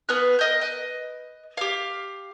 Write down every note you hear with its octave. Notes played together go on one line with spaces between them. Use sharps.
B3 B4 F5 F#6
A#4 D#5 G6
B4 D#5
G4 F5